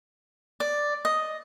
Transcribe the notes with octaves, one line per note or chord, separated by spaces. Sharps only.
D5
D#5